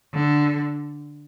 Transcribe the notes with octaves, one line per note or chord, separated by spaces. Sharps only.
D3